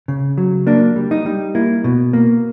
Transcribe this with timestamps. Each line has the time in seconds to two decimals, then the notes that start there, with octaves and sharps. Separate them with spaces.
0.08 C#3
0.38 F#3
0.67 A#3 D4
0.96 G3
1.11 D#4
1.26 G3
1.55 A#3 E4
1.84 B2
2.13 A#3